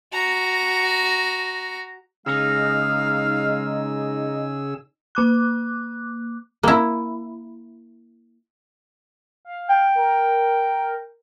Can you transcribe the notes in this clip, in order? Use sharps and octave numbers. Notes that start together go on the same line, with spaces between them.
F#4 A#5
C#3 G#3 D#4 G#4 F5 E6
A#3 D6 F#6
A#3 E4
F5
G5
A#4